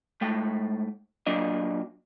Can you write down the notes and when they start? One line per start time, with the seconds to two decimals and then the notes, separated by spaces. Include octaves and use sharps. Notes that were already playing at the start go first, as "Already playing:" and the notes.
0.21 G#2 A3 G5
1.27 A#2 F#3 D4 D#5